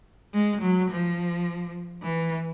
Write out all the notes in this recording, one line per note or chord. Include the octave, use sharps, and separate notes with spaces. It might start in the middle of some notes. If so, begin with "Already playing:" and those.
G#3
F#3
F3
E3